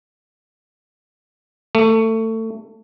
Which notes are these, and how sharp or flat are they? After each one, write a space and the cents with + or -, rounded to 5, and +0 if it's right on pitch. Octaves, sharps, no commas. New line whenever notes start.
A3 +25